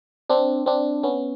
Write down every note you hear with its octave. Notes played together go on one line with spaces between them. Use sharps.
C4 D4
C4 D4
B3 C#4